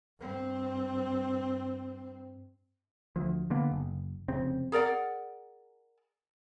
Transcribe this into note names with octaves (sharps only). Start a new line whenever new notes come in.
G2 C4
D2 F3
D3 A#3 B3
F#1
F1 C#3 C4
G#4 A#4 D5 F#5